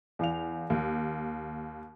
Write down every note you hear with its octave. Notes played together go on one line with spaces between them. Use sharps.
E2 F5 F7
D#2